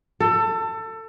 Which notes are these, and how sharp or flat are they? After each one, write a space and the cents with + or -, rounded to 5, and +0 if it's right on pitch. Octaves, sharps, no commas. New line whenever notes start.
A4 +25